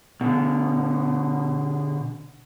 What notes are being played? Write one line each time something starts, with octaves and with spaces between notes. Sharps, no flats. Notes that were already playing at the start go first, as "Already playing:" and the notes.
B2 D3